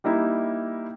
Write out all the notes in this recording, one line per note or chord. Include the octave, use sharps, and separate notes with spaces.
G3 A#3 D#4 E4